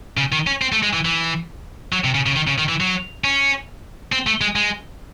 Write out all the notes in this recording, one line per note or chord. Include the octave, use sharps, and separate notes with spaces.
C#3
D#3
C#4
C4
A3
G#3
E3
E3
F#3
C3
C#3
C#3
D#3
C#3
D#3
E3
F#3
C#4
C4
A3
G#3
G#3